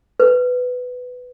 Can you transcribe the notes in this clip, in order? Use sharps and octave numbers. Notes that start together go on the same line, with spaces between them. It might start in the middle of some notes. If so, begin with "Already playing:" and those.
B4